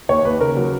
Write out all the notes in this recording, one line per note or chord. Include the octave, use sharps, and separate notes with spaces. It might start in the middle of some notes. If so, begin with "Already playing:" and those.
D#2 C#5
D#2 B4
C#3 A#4
F#3